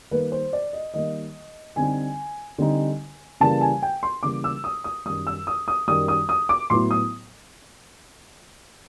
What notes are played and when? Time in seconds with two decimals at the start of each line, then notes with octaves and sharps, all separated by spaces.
0.11 D#3 G3 A#3 B4
0.32 C5
0.53 D5
0.73 D#5
0.94 D#3 G3 A#3 D#5
1.76 D3 G3 C4 D#4 G#5
2.58 D3 G3 C4 D#4
3.40 C#3 E3 G3 A#3 A5
3.61 G#5
3.82 G5
4.03 C6
4.23 C#3 E3 G3 A#3 D6
4.44 E6
4.64 D#6
4.84 D#6
5.06 F#2 D#3 G3 D#6
5.27 E6
5.47 D#6
5.68 D#6
5.88 F#2 D#3 G3 D#6
6.08 D#6
6.29 D#6
6.49 D6
6.70 A2 F#3 B3 E4 C6
6.91 D#6